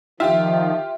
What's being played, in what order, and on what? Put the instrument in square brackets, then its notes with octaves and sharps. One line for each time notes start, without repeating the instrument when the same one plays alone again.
[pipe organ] D#3 F3 [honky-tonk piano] F4 G4 [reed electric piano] E5